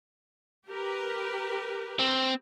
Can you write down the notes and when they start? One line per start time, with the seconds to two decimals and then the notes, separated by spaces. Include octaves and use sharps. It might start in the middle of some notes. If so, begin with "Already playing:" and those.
0.67 G4 A#4 B4
1.99 C4